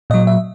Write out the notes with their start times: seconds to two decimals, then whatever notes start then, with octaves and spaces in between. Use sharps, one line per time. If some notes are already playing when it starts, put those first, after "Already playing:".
0.10 A#2 F#3 D#5
0.27 E5